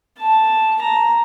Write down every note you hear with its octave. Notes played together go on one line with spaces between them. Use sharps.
A5
A#5